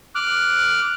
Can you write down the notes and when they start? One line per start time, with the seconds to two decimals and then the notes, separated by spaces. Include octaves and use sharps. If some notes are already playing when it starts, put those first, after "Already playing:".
0.15 D6 F6 F#6